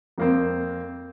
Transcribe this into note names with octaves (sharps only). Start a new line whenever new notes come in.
F2 A#3 C4